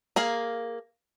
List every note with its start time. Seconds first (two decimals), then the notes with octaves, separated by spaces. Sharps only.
0.16 A#3 G#4 F5